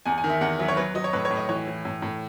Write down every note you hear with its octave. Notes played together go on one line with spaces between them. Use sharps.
E2 G#5
G#5
D#3
E5
E2 F#5
F#3 E5
C#5
F#3 B4
F#3 D#5
C#5
A2 B4
C#5
A2
D#5
E3 C#5
E3
A2
A2